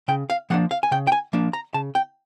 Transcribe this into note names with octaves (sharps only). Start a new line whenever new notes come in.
C#3 G5
F5
F3 A#3 D4 F#5
F5
G#5
C#3 G5
G5
G#5
F3 A#3 D4
A#5
C#3 A5
G5